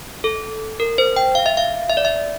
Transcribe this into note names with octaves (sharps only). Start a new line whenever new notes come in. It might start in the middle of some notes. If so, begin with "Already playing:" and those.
A4
A#4
C5
G5
F5
E5
F5
E5
D5
E5